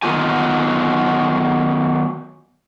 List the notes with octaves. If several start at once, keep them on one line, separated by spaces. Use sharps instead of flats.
D#3 F#3 B3 F4 G4 G#5